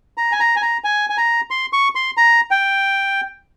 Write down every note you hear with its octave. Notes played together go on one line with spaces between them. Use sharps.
A#5
G#5
A#5
G#5
A#5
G#5
G#5
A#5
C6
C#6
C6
A#5
G5